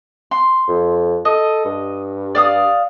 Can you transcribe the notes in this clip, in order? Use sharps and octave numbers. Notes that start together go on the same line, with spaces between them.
C6
F2
A4 D#5
G2
D5 F5 D#6